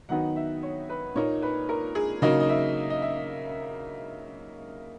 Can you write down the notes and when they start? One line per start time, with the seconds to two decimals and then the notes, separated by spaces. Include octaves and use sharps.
0.09 D#3 F#3 B3 D#4 F#5
0.36 E5
0.63 C#5
0.89 B4
1.15 A#2 A#3 D#4 C#5
1.42 B4
1.69 A#4
1.95 G#4
2.22 C#3 F#3 A#3 D#4 D#5
2.40 D#5
2.49 E5
2.90 D#5
3.02 E5